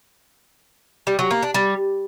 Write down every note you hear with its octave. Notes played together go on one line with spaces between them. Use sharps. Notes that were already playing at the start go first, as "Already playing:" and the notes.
G3
F#3
A#3
D4
G3